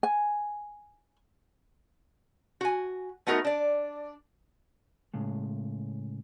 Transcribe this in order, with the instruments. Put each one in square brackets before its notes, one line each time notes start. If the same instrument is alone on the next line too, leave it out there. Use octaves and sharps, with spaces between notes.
[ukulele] G#5
[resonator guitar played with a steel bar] F#4 G#5
A3 B3 D#4 F#4 A#4
D4 D5
[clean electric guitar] A2 C#3 G#3